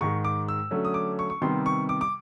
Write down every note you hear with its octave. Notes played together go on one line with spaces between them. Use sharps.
G#2 D#3 G#3 C#6
D6
E6
D3 F#3 A3 C#4
D#6
D6
C#6
C#6
C3 D#3 G3 B3 C6
C#6
D6
D6